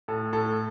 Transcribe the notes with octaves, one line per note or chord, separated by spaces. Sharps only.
A2 A4
A2 A4